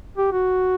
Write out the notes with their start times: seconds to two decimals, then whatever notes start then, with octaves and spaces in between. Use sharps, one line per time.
0.18 G4
0.32 F#4